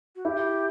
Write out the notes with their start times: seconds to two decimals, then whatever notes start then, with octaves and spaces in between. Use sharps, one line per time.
0.16 F#4
0.25 E4 G4